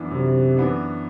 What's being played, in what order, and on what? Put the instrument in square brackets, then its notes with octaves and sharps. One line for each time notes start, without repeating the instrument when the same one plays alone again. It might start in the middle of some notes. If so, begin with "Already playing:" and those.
Already playing: [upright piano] F#2 E3 B3 D4
[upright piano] F#2 [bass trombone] C3
[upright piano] E3 B3 D4